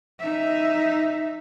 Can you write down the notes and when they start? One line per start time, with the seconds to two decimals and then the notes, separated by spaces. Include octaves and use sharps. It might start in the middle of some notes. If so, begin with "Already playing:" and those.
0.20 D#4 E5